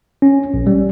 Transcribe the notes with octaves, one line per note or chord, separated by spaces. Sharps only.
C#4
A#1
G3